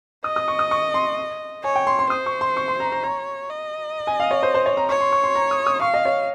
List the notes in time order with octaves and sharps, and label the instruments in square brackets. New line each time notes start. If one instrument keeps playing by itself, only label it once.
[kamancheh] D#5 [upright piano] D#6
[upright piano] D#6
C#6
D#6
C#6
C6
[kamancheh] C#5 [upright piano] G#5
[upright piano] G5
C6
C6
[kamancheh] C5 [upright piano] D#6
[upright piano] C#6
C6
C#6
C6
A#5
A#5
[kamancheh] C#5 [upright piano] A#5
[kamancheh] D#5
[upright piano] G#5
F5
C#5
C5
C5
C#5
A#5
[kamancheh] C#5 [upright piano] C#6
[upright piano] C6
C#6
C6
A#5
D#6
D#6
[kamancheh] F5 [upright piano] C#6
[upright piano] D#5
C#5